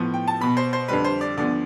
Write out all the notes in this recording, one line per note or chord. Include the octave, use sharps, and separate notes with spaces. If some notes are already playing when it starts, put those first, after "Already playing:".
Already playing: A2 F3 B3
G5
A5
B2 B3 B5
C5
C5
F2 D3 G3 B4
C5
D5
D2 D3 F3 B3 D5